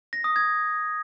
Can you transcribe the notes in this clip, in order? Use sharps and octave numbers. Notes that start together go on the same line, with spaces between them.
A#6
D#6
G#6